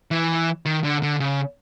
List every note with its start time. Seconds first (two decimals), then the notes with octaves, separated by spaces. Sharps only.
0.11 E3
0.65 D#3
0.84 D3
1.02 D3
1.20 C#3